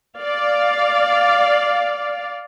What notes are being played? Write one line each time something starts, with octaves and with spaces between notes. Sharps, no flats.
D5 F5